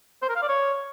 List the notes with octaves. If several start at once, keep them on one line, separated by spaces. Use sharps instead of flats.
C5
A#4
F5
D5
C#5